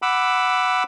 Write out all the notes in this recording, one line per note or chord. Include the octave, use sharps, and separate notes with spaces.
F#5 B5 D6 E6